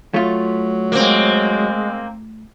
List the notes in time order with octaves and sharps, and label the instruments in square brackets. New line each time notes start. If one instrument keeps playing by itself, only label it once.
[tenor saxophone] F#3 [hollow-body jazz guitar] A3 F4
[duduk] G#3 [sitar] A#3 C4